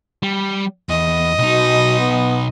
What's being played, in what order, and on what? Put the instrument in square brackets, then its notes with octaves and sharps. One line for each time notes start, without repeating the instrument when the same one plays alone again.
[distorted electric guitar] G3
[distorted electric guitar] E2 [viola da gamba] D#5
[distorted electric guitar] B1 D#4 [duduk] B2
[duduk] B3